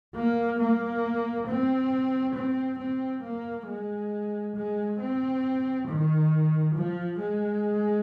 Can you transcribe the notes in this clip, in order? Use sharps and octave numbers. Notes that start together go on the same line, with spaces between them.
A#3
A#3
C4
C4
C4
A#3
G#3
G#3
C4
D#3
F3
G#3